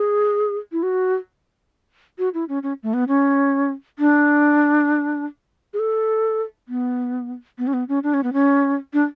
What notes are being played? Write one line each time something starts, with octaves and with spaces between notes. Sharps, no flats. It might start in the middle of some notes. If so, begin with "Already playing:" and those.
Already playing: G#4
E4
F#4
F#4
E4
C#4
C#4
A3
B3
C#4
D4
G#4
A4
B3
B3
C#4
B3
C#4
D4
C#4
B3
C#4
D4